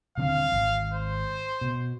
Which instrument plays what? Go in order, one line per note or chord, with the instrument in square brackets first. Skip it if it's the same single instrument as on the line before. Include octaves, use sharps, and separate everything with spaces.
[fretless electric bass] D#1 D3 C4 [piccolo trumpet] F5
[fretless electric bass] G#1
[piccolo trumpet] C5
[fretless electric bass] B2